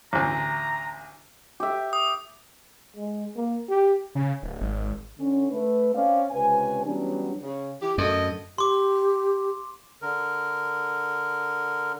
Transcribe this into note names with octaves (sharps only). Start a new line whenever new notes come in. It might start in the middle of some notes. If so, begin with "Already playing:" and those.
A1 D2 A#5
G4 E5
D#6
G#3
A#3
G4
C#3
D1
G#1
D3 C#4
A3 B4
C4 C#4 C5 D5 F5
C#2 C3 C4 C#4 B4 G#5
E3 F#3 G3 B3 C#4 D4
C#3
E3 G4
F#2 D3 A3 D#5
G4 C6 D6
D3 A#4